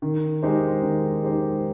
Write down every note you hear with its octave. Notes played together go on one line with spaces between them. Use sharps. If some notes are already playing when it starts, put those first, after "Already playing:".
D#3
G#3 D#4 G4 C5
D#3
G#3 D#4 G4 C5